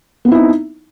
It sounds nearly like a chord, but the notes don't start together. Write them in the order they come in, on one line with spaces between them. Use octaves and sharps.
B3 C4 E4 D#4